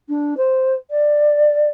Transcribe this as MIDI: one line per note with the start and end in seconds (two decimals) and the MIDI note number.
0.09 0.34 62
0.37 0.74 72
0.90 1.70 74